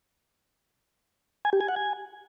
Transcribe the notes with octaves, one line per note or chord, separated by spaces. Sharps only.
G#5
G4
G#5
F#5
G#5